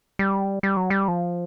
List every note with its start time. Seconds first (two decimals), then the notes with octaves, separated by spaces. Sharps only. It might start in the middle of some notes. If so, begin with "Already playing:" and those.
0.19 G3
0.63 G3
0.77 F#3
0.90 G3
1.08 F3